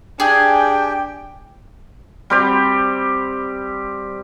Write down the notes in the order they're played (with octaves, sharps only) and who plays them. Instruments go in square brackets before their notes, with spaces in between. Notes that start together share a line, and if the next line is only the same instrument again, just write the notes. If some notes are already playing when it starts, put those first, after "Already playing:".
[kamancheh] D4 [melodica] G4 [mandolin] G#4 [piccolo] G5
[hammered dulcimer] G3 C4 G4